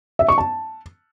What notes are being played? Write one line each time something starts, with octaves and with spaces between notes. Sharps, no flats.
E5
C#6
A5